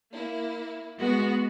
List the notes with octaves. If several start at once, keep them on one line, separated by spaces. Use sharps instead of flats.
A#3 E4
G#3 B3 F#4